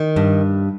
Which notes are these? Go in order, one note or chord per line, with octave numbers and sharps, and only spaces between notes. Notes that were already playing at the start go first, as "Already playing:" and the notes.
Already playing: D#3
G2